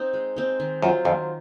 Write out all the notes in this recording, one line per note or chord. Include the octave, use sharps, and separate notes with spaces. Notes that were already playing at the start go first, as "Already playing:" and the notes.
Already playing: C4 D#4
G#3
C4 D#4
D#3
F#2 F#3 C4 F4
F2 D#3